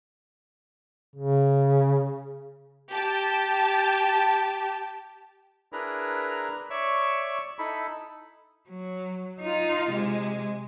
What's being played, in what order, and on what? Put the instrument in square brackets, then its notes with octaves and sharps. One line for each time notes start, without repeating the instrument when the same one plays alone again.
[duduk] C#3
[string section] G4 A5
[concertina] D4 E4 G#4 A#4 B4 A#5
C#5 D5 E5 C#6
D#4 E4 A4 B5
[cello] F#3
D#4 F4
C3 G#3